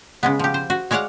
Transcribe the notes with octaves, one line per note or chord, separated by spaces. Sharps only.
C#3 G#3 B3
F3 G4
C5
F#4
G#3 C#5 D5 F5 F#5